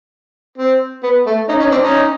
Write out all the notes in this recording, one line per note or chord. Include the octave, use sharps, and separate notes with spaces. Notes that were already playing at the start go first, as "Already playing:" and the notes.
C4
B3
A3
C#4 D#4
C#4 D#4
C4 D4
C#4 D#4